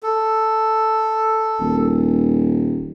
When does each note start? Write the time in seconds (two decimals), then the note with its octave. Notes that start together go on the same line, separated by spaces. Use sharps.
0.03 A4
1.60 D#1